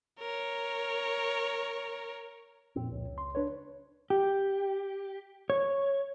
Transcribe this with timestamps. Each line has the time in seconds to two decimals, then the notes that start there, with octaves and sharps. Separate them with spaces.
0.20 A#4 C#5
2.76 F2 A#2 C4
2.92 C#2
3.18 C6
3.35 D4 B4 C#5
4.10 G4
5.50 C#5